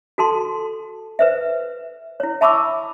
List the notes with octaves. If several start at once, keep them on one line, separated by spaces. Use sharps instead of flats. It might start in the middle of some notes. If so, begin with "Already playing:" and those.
F#4 A4 A5 C6
B4 C5 E5
E4 C#5
E5 A5 B5 C#6 D6 E6